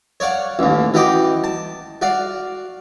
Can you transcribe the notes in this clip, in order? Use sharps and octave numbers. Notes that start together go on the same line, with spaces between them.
C#5 D5 F5 F#5
A1 D#2
E3 F#4 D#5 G5 D6
A5
F#4 D5 F5